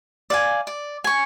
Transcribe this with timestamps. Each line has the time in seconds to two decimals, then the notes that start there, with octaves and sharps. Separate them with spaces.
0.30 D5 F5 G#5
0.67 D5
1.04 G#5 C#6